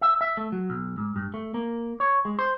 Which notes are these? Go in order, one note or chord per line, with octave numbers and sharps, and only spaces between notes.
E5
E5
A3
F#3
B1
G#2
G2
A3
A#3
C#5
G#3
C5